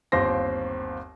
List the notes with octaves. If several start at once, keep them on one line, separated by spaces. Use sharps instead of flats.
G1 D#2 C4 C6 A#6